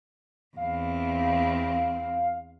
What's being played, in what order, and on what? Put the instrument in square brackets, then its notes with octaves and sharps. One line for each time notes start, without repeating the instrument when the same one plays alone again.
[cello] E2 C4 [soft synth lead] F5